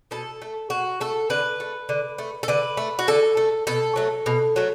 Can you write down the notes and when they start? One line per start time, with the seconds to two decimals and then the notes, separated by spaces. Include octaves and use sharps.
0.11 B2 A4
0.42 A3
0.70 B2 F#4
1.01 A3 A4
1.30 D3 B4
1.60 A3
1.89 D3
2.18 A3
2.43 A4
2.48 D3 B4
2.77 A3
2.99 F#4
3.08 D3 A4
3.37 A3
3.67 B2 A4
3.96 F#3 A3
4.26 B2
4.56 F#3 A3